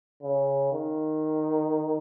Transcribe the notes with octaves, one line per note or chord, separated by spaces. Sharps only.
C#3
D#3